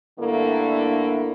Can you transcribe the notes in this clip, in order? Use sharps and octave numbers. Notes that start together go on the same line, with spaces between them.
G2 D3 A3 A#3 D4 E4